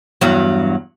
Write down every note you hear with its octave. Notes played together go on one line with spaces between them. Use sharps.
E2 G2 F#3